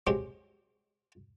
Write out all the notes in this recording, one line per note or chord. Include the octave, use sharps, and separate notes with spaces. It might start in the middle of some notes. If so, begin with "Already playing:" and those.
F#3 G#3 C4 G4